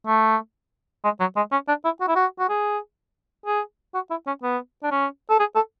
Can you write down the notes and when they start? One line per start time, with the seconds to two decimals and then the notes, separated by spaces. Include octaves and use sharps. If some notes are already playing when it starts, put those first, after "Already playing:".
0.07 A3
1.04 G#3
1.20 F#3
1.37 G#3
1.52 C#4
1.68 D4
1.85 E4
2.01 F#4
2.08 E4
2.16 F#4
2.39 F#4
2.49 G#4
3.46 G#4
3.94 F#4
4.11 E4
4.27 C#4
4.43 B3
4.83 D4
4.91 C#4
5.30 A4
5.40 G#4
5.56 A4